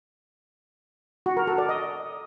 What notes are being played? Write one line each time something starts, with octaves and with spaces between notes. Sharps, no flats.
F#4
A#4
A4
D5
D#5